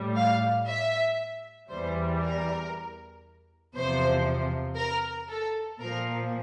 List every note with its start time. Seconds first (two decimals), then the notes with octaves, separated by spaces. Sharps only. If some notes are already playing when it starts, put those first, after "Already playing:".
Already playing: A2 G3
0.16 F5
0.66 E5
1.69 E2 E3 G3 C5
2.21 A#4
3.74 E2 C3 F3 C5
4.76 A#4
5.29 A4
5.79 A#2 F3 A#4